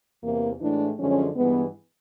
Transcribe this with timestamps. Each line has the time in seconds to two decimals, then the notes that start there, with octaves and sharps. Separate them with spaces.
0.23 E2 C3 E3 A#3
0.60 A2 E3 G#3 D4
0.98 F#2 D3 F3 G#3 C#4
1.36 G2 E3 G#3 B3